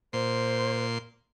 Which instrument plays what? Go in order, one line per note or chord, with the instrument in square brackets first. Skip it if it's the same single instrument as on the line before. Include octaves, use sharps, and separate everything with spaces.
[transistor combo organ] A#2 C6 [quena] C5